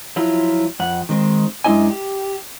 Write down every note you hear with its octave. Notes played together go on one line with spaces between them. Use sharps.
F3 F#3 E4 F4
F2 F#5
D#3 G#3 C4
F#2 G#3 D4 E4 D#5 G#5
G4